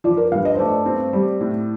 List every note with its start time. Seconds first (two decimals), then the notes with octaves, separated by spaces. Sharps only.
0.04 F3 D5
0.17 A#4
0.32 G2 F5
0.45 D#5
0.55 C5
0.59 A3 D5
0.86 C4
1.13 G3
1.41 A2